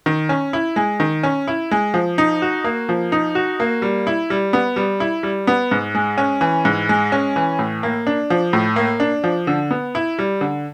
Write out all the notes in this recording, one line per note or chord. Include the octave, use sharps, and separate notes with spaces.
D#3
C#4
E4
G#3
D#3
C#4
E4
G#3
F3
D#4
F#4
A#3
F3
D#4
F#4
A#3
G3
E4
G3
B3
G3
E4
G3
B3
G#2
G#3
C#4
E3
G#2
G#3
C#4
E3
A2
A#3
D4
F3
A2
A#3
D4
F3
D3
B3
E4
G3
D3